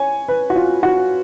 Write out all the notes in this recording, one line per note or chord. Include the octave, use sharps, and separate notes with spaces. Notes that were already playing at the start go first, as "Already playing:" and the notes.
Already playing: C#5 G#5
B4
F#4
F4
F#4